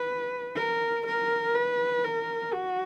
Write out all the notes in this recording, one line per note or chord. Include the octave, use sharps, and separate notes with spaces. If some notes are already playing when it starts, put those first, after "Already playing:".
Already playing: B4
A#4
A#4
B4
A#4
F#4